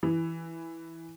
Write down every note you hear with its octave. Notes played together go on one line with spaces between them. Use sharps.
E3